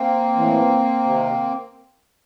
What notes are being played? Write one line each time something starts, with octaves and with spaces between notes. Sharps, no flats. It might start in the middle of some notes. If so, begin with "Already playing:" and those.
Already playing: A#3 C4
A2 E3
C3 D#3